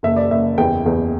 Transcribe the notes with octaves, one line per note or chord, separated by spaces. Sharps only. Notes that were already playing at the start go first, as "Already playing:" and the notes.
F#1 E5
D5
F#1 E5
E2 G5
E2